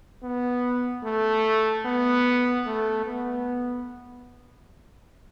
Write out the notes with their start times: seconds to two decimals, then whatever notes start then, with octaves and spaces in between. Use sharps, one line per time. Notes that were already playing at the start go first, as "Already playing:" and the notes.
0.23 B3
1.03 A3
1.85 B3
2.66 A3
3.06 B3